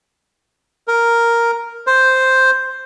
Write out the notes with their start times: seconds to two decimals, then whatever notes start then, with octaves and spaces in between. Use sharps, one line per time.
0.88 A#4
1.87 C5